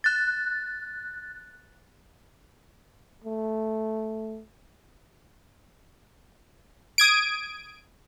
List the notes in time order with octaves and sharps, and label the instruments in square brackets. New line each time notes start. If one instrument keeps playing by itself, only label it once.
[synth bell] F#6 A6
[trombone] A3
[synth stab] D#6 G#6 D7